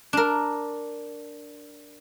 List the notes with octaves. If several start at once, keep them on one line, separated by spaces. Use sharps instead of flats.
D4 A#4